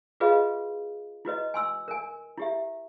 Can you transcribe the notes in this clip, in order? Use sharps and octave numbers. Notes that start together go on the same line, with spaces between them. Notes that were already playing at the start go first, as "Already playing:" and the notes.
F4 F#4 G#4 B4 D#5 F5
E4 F#4 B4 D#5
G#5 C6 E6
A#4 G#5
E4 G4 E5